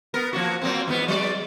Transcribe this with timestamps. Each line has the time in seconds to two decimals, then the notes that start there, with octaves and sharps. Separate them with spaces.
0.14 B3 A#4
0.33 F3 A#3 F#4
0.62 F#3 A#3 C4
0.88 E2 G#2 B3
1.08 F#3 G#3 D5